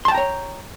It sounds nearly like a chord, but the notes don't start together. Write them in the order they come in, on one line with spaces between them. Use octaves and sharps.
C6 A5 G5 A#5 C#5